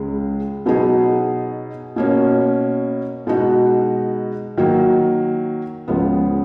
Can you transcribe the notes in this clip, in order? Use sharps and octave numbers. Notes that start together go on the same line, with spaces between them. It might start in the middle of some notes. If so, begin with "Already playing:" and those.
Already playing: C#2 C#3 G#3
B2 F#3 B3 D#4 G#4
B2 A#3 C#4
B2 G#3 D#4 F#4
D#3 F#3 A#3
C#2 C#3 F3 B3